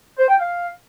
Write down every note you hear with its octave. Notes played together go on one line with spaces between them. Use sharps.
C5
G5
F5